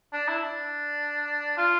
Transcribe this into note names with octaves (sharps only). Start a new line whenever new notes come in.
D4
E4
D4
F4